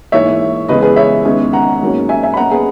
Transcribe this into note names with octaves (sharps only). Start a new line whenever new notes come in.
G#2 E3 A#3 C#5 E5
C#3 E3 G#3 B3 B4 D#5
G#4 B4
C#5 E5
E2 D#3 G#3 C#4
F#5 A#5
G#2 F#3 A#3 C#4
E5 G#5
E5 G#5
B5
B2 A#3 C#4 F#5 A#5
G#4 B4